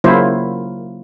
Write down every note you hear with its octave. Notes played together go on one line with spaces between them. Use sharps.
C#3 F#3 A#3 E4 F4 C5